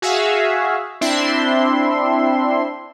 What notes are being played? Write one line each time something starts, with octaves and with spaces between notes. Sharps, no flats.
F#4 G#4 E5 F5
C4 D4 E4 E5 C6